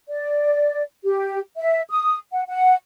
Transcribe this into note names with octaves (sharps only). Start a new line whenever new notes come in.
D5
G4
E5
D#6
F#5
F#5